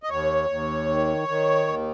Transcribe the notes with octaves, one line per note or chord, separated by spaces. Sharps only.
D#5
D#2 C#5
D#2
D#3
D#3
D#2